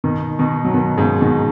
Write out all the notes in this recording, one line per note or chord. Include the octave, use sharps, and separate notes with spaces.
B2 D#3
B2 D#3
F#3
B2 D#3
G#2 C#3
B2 D#3